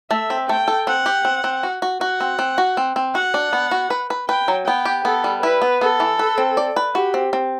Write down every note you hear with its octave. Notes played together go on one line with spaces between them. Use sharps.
A3 E5
C4
A3 G5
A4
C4 F#5
G4
C4
C4
F#4
F#4
F#4 F#5
C4
C4
F#4
C4
C4
F#4 F#5
D4
B3
F#4
B4
B4
B4 G5
F#3
B3 G5
G4
B3 A4
G3
E4 B4
B3
B3 A4
E3
B4
C4
D5
B4
F#4 G4
C4
C4